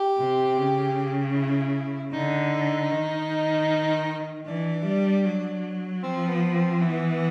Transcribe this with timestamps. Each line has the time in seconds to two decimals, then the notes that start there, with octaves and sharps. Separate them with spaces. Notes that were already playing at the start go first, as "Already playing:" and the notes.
Already playing: G4
0.19 C3
0.57 C#3
1.35 E4
2.13 D3 D#4
2.91 D#3
4.47 E3 D4
4.86 G3
5.25 F#3
6.03 F3 C4
6.28 B3
6.55 C4
6.81 E3 B3